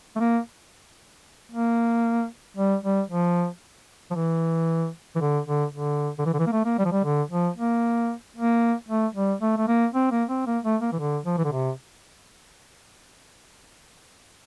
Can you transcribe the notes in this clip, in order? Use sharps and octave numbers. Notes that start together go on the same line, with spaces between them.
A3
A#3
A#3
G3
G3
F3
F3
E3
E3
D3
D3
D3
D3
E3
D3
E3
A#3
A3
A#3
G3
F3
G3
D3
F3
A#3
A#3
A3
G3
A3
A3
A#3
C4
A#3
C4
A#3
A3
A#3
E3
D3
F3
E3
D3
C3